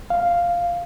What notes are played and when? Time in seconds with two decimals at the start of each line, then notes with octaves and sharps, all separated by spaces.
0.10 F5